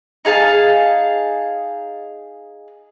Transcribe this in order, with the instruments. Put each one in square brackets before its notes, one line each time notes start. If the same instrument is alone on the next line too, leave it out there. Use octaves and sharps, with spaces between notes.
[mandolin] D#4 G#4 F5 A5